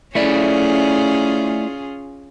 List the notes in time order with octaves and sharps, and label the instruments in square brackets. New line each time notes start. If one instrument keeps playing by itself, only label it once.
[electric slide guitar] A3 E4 D5 [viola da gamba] C#4 F4 G#4